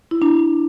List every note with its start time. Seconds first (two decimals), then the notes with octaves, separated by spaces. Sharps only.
0.11 E4
0.22 D4